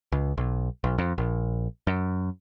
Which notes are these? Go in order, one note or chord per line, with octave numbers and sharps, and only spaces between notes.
C#2
B1
B1
F2
A#1
F#2